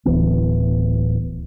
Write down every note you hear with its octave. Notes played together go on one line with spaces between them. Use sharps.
D1 D#2 E3 B3